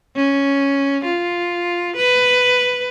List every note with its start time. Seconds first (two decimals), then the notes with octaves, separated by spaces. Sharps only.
0.16 C#4
1.04 F4
1.96 B4